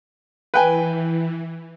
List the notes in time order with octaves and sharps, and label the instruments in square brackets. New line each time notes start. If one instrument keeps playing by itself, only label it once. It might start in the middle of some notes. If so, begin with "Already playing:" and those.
[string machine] E3 [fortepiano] B4 G5 G#5